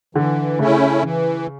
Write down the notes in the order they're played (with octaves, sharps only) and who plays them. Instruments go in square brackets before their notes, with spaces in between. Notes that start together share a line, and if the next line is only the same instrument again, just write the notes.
[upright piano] D3 [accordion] E3
[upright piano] C#3 [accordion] A3 C#4 E4
[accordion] E3